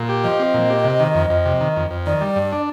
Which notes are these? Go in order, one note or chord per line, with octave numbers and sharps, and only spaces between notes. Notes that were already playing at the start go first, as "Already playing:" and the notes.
Already playing: A#2
G4
F3 D#5
C4
A#2
G4
C3
D#3
F2
F2
C3
D#3
F2
F2
D#3 D5
G3
G2
D4